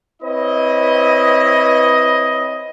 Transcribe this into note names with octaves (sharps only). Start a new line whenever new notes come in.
C4 E4 B4 C#5 D#5